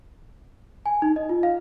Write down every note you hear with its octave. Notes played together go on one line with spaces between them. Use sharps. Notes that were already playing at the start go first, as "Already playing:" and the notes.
G#5
D#4
D#5
F4
F5